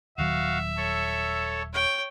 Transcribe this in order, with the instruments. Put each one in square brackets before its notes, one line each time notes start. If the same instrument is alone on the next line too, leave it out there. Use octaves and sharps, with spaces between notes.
[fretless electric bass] D#1 D#3 F#3 [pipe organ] F#4 F5 [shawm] E5
[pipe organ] A4 C#5
[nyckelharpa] C#5 G5